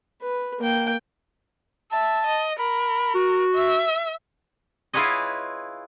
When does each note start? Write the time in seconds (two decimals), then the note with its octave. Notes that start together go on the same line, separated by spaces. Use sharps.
0.22 B4
0.59 A#3 G5
1.92 E5 A5
2.26 D#5
2.59 A#4 B5
3.15 F#4
3.54 E5
4.93 E4 F4 G#4 B4 C#5 D#5